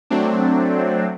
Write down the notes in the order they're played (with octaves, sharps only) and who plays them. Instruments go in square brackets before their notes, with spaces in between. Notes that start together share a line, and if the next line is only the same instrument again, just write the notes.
[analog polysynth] F#3 A3 C4 D4